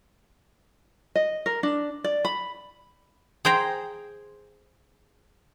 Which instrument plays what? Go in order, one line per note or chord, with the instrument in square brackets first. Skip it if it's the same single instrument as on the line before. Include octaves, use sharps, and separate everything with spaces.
[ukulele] D#5
A#4
D4
D5
B5
[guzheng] G#4 C5 G5 A#5